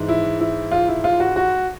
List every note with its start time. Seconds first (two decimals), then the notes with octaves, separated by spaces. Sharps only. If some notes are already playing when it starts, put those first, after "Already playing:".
Already playing: G#2 E3
0.08 E4
0.40 E4
0.72 F4
0.88 E4
1.04 F4
1.20 F#4
1.36 F#4